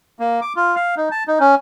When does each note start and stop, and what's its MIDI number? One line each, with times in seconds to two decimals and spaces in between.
0.19 0.40 58
0.42 0.53 86
0.56 0.75 65
0.76 0.95 77
0.97 1.09 63
1.11 1.24 81
1.28 1.38 63
1.40 1.55 61